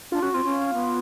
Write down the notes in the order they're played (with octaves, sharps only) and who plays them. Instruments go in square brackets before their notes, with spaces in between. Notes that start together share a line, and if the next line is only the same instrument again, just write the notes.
[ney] D4 [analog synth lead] F4
[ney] C#4 [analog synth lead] F#4
[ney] C4 [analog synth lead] F4
[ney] C#4
B3